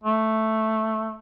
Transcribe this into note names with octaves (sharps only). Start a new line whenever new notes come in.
A3